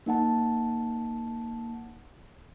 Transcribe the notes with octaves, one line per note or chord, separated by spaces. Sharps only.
A#3 D#4 F#5 A5